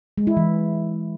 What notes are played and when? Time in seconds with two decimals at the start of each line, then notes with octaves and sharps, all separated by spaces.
0.18 G#3
0.27 E4
0.37 E3